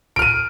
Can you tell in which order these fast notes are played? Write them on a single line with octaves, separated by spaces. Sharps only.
D7 F6 D#7